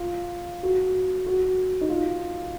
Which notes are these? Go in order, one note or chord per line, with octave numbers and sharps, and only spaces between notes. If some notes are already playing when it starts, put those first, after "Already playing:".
Already playing: F4
F#4
F#4
D#4
F4